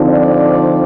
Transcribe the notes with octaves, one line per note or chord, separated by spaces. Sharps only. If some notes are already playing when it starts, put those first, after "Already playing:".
Already playing: D3 F3 C4 D#4
D5